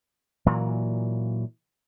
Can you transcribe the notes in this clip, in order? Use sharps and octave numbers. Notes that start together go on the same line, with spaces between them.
A#2 E3 F#3